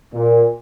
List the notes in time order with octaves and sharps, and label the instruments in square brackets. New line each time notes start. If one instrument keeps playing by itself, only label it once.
[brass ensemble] A#2